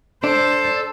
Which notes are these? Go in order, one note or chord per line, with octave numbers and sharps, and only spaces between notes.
D4 A4 C5 D5